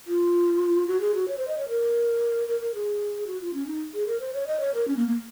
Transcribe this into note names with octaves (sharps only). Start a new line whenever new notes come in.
F4
F#4
G#4
F#4
C#5
C5
D#5
C#5
A#4
A#4
A#4
G#4
F#4
F4
C#4
D#4
G#4
A#4
C5
C#5
D#5
C#5
A#4
C#4
A#3
A#3